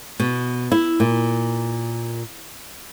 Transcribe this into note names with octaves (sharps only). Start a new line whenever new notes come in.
B2
E4
A#2